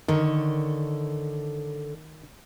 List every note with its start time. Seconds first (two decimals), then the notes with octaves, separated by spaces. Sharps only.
0.08 D3 D#3 A4 C#5